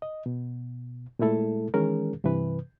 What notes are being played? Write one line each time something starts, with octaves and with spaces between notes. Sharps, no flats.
D#5
B2
A#2 G#3 A3 E4 A4
D#3 E3 G#3 C#4 G#4 A#4
G2 C3 E3 B4